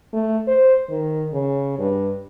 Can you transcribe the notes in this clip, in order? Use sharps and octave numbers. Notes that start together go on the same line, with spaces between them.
A3
C5
D#3
C#3
G2